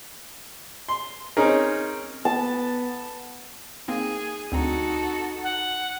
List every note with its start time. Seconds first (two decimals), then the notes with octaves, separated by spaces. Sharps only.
0.89 C6
1.37 C4 C#4 D#4 G#4 A#4
2.25 B3 A5
3.88 A#3 C4 D#4 G#4
4.52 D2 C4 D#4 F#4 A4 A#5
5.43 F#5